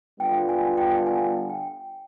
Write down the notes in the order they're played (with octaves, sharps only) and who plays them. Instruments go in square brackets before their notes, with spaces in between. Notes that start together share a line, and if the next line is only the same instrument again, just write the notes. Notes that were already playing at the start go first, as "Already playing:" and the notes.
[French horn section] D3 G3 B3 D4 F4 [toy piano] G5
[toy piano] G#5
G5
G#5
G5